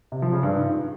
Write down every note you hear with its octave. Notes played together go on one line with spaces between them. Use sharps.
C3
F3
C#3
G2
G#2